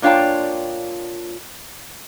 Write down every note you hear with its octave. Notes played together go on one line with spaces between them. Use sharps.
A#2 D4 F4 C#5 G5 A5